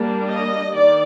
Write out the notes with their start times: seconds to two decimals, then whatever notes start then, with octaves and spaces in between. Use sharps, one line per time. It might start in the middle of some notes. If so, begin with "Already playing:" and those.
Already playing: G3 A#3 D4
0.27 D#5
0.74 D#3 D5